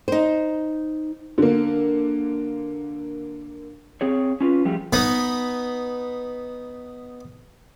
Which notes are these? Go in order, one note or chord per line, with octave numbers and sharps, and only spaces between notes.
D#4 C5
D3 A#3
C4 G#4 C#5
C#4 F4 B4
F3 G3 A3 G4 G#4
B3 D#4 B4